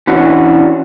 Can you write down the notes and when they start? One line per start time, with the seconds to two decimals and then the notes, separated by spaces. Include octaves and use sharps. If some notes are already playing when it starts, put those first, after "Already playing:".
0.07 E3 C#4 D4 F#4